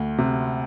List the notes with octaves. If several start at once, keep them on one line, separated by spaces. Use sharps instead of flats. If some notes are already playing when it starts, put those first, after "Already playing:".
Already playing: D2
C3